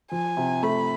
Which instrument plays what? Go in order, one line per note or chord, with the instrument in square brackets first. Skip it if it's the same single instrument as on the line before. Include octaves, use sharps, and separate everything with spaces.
[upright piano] F3 [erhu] G#5
[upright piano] C3
[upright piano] A3 [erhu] B5